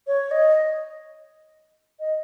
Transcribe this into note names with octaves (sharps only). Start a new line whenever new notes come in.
C#5
D#5
D#5